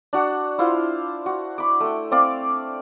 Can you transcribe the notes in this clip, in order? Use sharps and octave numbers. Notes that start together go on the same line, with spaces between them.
D4 F#4 F#5
E4 F4 C5 F5
F#4
B5 D6
A3 G5
C4 D5 F5 D6